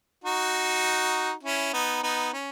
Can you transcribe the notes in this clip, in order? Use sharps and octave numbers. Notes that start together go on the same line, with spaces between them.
D#4 F#4
C#4 E4
B3 D#4
B3 D#4
C#4